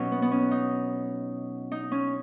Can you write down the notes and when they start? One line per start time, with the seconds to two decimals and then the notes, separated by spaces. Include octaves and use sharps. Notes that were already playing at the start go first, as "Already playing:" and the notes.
Already playing: B2 F#3 C#4 D#4
0.12 B3
0.22 B3
0.31 C#4
0.51 D#4
1.72 D#4
1.92 C#4